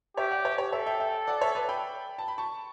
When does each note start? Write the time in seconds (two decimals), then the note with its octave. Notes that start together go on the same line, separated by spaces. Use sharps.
0.17 G4 C#5 E5
0.31 D5 F#5
0.44 C#5 E5
0.58 C#5
0.72 A4 C#5 E5
0.86 E5 G5
1.00 E5 G5
1.27 D5 F#5
1.41 C#5 E5
1.55 B4 D5
1.69 G5 B5
2.19 A5
2.28 B5
2.38 A5 C#6